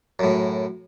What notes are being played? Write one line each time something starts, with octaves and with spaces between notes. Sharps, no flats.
F#2 A2